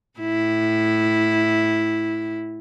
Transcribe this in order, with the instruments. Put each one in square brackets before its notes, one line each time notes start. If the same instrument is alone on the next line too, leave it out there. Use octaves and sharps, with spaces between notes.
[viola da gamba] A2 E4